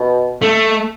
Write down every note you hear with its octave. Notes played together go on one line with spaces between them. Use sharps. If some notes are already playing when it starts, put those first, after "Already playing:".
Already playing: B2
A3